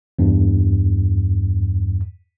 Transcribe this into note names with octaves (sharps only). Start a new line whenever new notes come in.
E2 G2